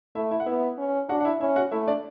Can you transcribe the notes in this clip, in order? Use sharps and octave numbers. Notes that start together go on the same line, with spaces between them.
A3 E4 E5
E4 E5
F#5
B3 E4 E5
C#4
D4 F#4 F#5
F#5
E4 E5
C#4 E4 E5
F#4 F#5
A3 E4 E5
D4 D5